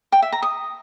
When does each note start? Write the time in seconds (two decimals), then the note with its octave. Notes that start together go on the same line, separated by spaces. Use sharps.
0.12 G5
0.22 E5
0.32 A#5
0.42 D#6